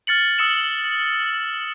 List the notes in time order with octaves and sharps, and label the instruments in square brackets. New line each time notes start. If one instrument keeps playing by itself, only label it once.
[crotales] F6 A6 C#7 F#7
D#6 E6 C#7 E7 F#7